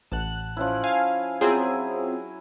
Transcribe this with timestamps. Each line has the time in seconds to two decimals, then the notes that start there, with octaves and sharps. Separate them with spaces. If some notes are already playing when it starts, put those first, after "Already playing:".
0.12 A1 F#5 A5 F#6
0.57 F3 C#4 E4
0.84 F5 G#5
1.41 F#3 C4 E4 F4 G#4 G#5